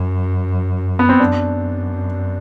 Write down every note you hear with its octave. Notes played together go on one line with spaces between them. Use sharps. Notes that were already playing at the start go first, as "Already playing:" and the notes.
Already playing: F#2
B3
C4
F#2 D4